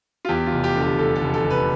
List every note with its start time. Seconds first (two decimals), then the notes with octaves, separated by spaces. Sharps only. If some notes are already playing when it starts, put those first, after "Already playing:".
0.25 F4
0.29 E2 G4
0.46 F4
0.52 F1
0.64 G4
0.76 D3
0.81 G4
0.98 F1 A4
1.16 A4
1.22 F1
1.34 A4
1.45 F1
1.50 B4